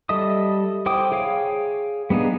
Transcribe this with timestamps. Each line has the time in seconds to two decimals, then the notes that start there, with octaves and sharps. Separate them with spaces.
0.09 G3 A4 D#5 E5 D#6
0.86 E4 C5 G5 D6 D#6
1.12 G#4 C#5 F5 G5
2.10 G3 B3 D4 D#4 G#4